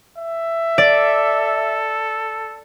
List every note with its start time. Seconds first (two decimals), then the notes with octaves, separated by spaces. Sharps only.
0.18 E5
0.78 A4 D5